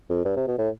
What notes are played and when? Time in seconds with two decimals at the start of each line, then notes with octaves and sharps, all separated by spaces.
0.10 F2
0.25 G2
0.36 C3
0.47 B2
0.59 A2